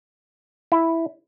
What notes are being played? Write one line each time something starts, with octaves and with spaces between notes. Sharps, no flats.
E4